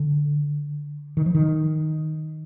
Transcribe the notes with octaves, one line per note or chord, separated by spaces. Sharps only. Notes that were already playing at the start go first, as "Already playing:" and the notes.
Already playing: D3
D#3
F3
D#3